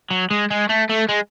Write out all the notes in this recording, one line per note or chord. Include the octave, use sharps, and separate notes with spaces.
F#3
G#3
G#3
A3
A3
G#3